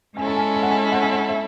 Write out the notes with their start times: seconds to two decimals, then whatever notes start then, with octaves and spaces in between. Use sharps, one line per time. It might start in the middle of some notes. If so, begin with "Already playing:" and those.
0.17 G#3 C#4 E4 A4 G#5
0.27 A5
0.36 G#5
0.54 G#5
0.63 F#5
0.71 G#5
0.92 F#5
1.03 G#5
1.13 F#5
1.29 E5